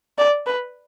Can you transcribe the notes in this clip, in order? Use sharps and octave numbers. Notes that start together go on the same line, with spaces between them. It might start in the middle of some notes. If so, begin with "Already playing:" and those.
D5
B4